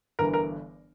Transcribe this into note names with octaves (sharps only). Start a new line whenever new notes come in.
G1 G2 E3 A#4
A#4